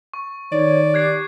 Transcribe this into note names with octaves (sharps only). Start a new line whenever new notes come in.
C#6
D#3 C#5 D5
G4 F#6 G#6 C7